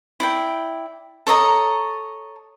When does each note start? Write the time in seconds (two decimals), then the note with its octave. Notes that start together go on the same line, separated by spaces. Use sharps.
0.20 E4 D5 G5
1.27 A4 C#5 D#5 A#5